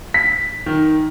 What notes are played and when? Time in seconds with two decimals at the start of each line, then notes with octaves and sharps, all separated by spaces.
0.14 B6
0.66 D#3